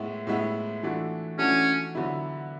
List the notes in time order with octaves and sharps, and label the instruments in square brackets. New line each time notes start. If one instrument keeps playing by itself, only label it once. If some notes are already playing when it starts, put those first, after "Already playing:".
Already playing: [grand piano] A2 G#3 B3 E4
A2 G#3 B3 E4
E3 A3 D4 F#4
[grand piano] E3 A3 D4 F#4 [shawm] C#4
[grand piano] D3 F#3 B3 E4